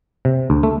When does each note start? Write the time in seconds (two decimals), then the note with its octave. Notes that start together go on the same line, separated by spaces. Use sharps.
0.25 C3
0.50 D2
0.63 A3